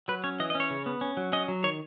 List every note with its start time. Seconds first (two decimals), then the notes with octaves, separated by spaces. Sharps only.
0.08 F#3 B4
0.24 C#4 C#5
0.40 E3 D#5
0.50 D#5
0.55 C#4
0.60 C#5
0.70 C#3
0.86 B3
1.01 C#4
1.17 F#3
1.32 C#4 D#5
1.48 F#3
1.64 D#3 C#5